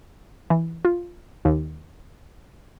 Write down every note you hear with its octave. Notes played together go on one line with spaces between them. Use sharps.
E3
F4
D#2